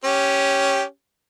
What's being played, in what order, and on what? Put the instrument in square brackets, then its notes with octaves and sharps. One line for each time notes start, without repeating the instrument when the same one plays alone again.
[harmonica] C#4 G4